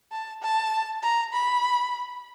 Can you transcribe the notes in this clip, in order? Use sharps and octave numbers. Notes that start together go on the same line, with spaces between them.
A5
A5
A#5
B5